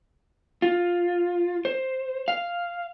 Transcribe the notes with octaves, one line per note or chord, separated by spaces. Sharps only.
F4
C5
F5